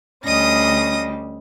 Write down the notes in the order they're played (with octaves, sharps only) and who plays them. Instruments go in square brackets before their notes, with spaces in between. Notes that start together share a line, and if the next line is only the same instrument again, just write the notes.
[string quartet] D2 G3 [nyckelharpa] C#4 D#5 [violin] D#6 A#6